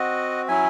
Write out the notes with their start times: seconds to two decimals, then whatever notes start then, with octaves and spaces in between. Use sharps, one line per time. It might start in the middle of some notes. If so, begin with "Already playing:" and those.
Already playing: C4 F#4 D#5 F#5
0.48 F#3 C#4 E4 E5 G#5